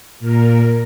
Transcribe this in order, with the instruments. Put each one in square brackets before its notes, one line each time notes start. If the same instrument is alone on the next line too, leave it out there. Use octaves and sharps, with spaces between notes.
[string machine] A#2 A#4